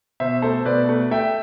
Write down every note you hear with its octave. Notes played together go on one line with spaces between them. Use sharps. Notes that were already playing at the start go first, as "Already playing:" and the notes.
B2 C5 E5
A3 A4 C5
B2 B4 D5
A3
A3 E5 G5